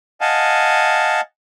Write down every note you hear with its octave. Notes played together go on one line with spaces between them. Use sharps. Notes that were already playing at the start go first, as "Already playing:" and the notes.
D#5 F5 F#5 G#5 A5